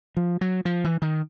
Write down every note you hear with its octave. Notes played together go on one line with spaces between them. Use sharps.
F3
F#3
F3
E3
D#3